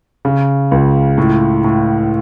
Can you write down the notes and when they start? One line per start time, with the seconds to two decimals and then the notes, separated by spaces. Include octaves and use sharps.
0.25 C#3
0.71 C#2
1.18 A2
1.64 A2